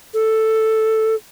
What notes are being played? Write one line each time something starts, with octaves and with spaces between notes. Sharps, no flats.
A4